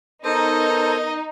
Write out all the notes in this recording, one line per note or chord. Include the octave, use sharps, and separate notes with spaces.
B3 D#4 A4 A#4 C5 D#5